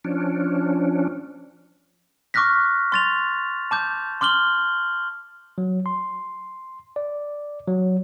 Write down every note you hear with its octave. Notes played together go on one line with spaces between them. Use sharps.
F3 C#4 D4
C#6 D6 F6 F#6 A#6 B6
C6 A6 F7
A5 D6 G6
C6 D6 F6 F#7 G7
F#3
C6
D5
F#3